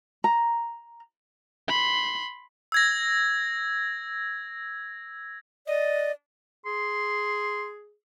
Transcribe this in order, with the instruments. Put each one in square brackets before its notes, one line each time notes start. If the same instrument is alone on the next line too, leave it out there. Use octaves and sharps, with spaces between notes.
[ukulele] A#5
[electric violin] B5 C6
[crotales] E6 G#6 A#6
[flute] D5 [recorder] D#5
[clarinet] G#4 [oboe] C6